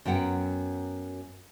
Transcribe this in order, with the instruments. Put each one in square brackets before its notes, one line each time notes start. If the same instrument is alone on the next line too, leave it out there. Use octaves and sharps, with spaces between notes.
[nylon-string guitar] F#2 F#3 B3 F#5 G5